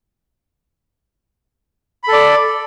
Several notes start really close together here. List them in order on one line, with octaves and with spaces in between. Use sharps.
B5 A4 D5